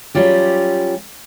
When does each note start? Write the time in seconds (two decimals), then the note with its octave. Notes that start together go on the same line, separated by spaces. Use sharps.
0.15 F#3 G3 C#4 F4 G4